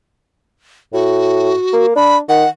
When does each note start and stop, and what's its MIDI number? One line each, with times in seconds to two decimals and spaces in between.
0.93 1.52 45
0.93 1.86 66
1.73 1.91 58
1.96 2.20 62
1.96 2.17 83
2.29 2.45 51
2.29 2.48 78